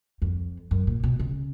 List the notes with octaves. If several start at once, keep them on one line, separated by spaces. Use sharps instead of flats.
F2
F#2
A#2
B2
C#3